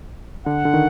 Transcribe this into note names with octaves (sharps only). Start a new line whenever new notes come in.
D3 F#5
D3
D#3